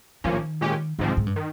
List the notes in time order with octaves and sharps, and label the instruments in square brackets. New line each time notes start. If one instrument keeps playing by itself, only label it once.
[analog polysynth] A#1 A#2 F3 A#3 C#4 [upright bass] D#3
[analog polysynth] A#2 G#3 C#4 G4
[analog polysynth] G#2 F3 C4 [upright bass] D#3
[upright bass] C3
G#2
G2
[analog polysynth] D#3